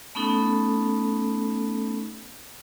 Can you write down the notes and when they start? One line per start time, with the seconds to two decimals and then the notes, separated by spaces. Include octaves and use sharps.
0.15 A3 B3 C#4 D#4 A4